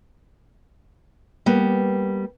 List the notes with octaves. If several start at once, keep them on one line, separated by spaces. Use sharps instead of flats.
G3 A#3 B3